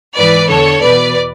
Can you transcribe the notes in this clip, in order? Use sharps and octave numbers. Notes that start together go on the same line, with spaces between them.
G#2 E3 B4 D5
E2 D3 A4 C#5
E2 B2 B4 D5